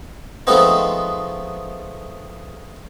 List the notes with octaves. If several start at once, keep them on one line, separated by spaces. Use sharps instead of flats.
F3 G#3 A3 B3 C4 D#4